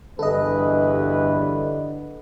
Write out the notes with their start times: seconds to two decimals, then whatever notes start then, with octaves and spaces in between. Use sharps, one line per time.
0.19 E2 G2 D3 A4 B4 D#5